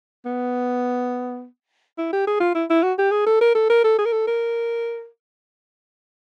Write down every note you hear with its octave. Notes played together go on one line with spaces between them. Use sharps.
B3
E4
G4
G#4
F4
E4
E4
F#4
G4
G#4
A4
A#4
A4
A#4
A4
G#4
A#4
A4
A#4